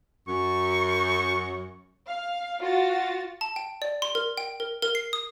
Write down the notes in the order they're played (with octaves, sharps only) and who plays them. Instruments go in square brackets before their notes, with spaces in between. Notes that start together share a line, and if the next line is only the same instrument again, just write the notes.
[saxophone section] F#2 [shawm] C#6
[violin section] F5
F4 F#4 A6
[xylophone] A5
G5
D5
C6
A#4
G5
A#4
A#4
C7
D#6